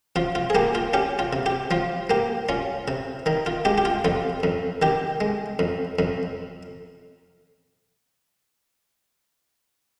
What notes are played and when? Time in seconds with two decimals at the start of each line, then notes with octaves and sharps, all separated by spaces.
0.16 F3 F4
0.35 F4
0.50 G#4
0.55 A#3 G4
0.75 F4
0.93 C#4 G4
1.19 F4
1.33 C3
1.46 G4
1.71 F3 F4
2.10 A#3 G4
2.49 C#4 F4
2.88 C3
3.26 D#3 D#4
3.46 F4
3.65 G#3 G4
3.78 G4
3.85 F4
4.05 F2 F4
4.43 F2
4.82 D#3 G4
5.21 G#3
5.59 F2
5.99 F2